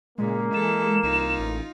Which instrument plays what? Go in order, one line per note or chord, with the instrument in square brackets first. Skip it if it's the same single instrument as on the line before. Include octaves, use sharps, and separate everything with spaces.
[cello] A#2 C#3 [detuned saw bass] G#3 [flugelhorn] A#3
[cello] E3 A4 [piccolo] E7
[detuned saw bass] C2 [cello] D#4 F4
[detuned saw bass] A1